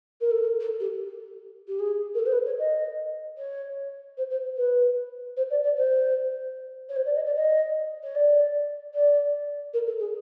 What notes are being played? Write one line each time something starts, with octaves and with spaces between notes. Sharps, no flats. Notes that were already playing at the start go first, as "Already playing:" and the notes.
A#4
A4
A#4
A4
G4
G4
G#4
A#4
A4
C5
B4
C#5
D#5
C#5
C5
C5
B4
C5
D5
D5
C5
C#5
C5
D5
D#5
D5
D#5
C#5
D5
D5
A#4
A4
G#4